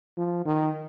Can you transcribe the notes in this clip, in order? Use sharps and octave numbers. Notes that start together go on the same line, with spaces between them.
F3
D#3